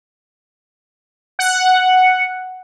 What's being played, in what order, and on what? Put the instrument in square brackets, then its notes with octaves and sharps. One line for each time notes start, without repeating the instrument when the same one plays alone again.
[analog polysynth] F#5